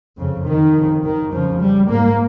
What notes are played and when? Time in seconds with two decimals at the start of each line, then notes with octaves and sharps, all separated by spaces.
0.18 F2 C#3
0.46 D#3
0.75 F2 C#3
1.04 D#3
1.32 F2 C#3 F3
1.60 G3
1.89 G#2 A#3